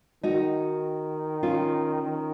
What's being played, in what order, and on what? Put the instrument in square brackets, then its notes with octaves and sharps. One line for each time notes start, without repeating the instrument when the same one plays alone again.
[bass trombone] D#3 [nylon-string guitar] D#4 F#4
[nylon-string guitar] C#4 F4
[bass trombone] D#3